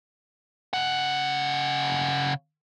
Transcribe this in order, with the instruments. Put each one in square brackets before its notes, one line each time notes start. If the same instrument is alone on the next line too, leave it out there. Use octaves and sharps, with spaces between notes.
[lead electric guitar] C#3 F#5